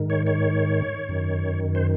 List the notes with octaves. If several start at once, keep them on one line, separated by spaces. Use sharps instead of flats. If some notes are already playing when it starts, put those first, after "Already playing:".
Already playing: G#2 D#3
C#5
C#5
F#2 D#3
C5